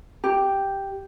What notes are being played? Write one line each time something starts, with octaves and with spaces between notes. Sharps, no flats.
G4